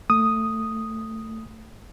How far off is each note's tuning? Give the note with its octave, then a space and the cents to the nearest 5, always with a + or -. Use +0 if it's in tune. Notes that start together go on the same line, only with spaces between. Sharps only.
A3 +20 D#6 +0